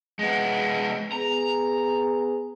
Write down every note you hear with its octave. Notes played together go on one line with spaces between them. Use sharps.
G#3 B3
B3 G#4 A#5